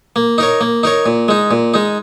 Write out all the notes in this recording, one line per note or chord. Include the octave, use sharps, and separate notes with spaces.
A#3
D#4 A#4 C#5
A#3
D#4 A#4 C#5
A#2
G#3 D#4
A#2
G#3 D#4